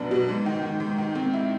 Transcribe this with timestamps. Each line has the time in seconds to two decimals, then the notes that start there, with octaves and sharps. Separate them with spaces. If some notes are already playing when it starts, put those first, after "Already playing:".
Already playing: F#2 B2 B3 D4
0.11 B2
0.29 G#2
0.46 D#3
0.63 D#3
0.80 G#2
0.98 D#3
1.15 C4
1.34 E4